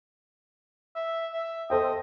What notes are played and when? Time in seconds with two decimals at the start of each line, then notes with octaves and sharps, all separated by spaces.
0.95 E5
1.33 E5
1.70 A4 C5 D#5 G5